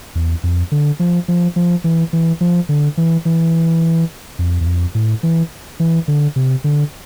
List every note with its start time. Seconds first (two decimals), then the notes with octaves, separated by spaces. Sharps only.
0.15 E2
0.43 F2
0.72 D3
0.99 F3
1.28 F3
1.56 F3
1.84 E3
2.13 E3
2.41 F3
2.69 D3
2.97 E3
3.25 E3
4.39 F2
4.61 E2
4.66 F2
4.95 A2
5.23 E3
5.80 E3
6.08 D3
6.36 C3
6.64 D3